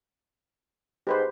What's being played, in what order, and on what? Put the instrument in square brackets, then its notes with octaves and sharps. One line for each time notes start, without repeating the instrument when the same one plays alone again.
[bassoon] G#2 [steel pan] G4 B4 C5